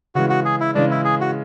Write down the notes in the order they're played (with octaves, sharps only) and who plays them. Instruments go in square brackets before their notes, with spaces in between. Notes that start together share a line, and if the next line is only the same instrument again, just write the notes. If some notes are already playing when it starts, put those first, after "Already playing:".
[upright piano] C#3 E3 G#3 [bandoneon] F#4
[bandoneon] F#4
G#4
E4
[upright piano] C#3 E3 G#3 [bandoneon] D4
[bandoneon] E4
G#4
F#4